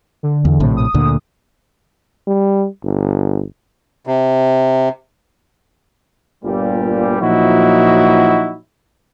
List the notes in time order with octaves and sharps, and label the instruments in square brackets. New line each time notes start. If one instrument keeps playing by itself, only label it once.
[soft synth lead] D3
[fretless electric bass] E2
A#1 A2 C3
[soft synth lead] D#6
[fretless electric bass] D2 A#2 D3
[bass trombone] G3
G1
[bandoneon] C3
[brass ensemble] G1 A#2 G3
A#2 F3 F#3 D#4 E4 F#4